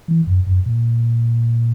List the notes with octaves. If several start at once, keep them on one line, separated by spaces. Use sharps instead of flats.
E3
F#2
F#2
A#2